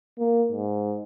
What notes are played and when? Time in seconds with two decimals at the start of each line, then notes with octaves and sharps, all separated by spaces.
0.19 A#3
0.52 G#2